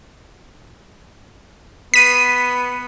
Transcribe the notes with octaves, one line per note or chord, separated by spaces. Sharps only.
B3 B6 D#7